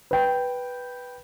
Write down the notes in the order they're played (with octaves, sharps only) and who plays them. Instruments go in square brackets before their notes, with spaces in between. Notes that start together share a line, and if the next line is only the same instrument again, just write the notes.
[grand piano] B4 G5